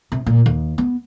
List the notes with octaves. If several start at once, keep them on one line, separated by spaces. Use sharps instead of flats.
C3
A#2
D#2
B3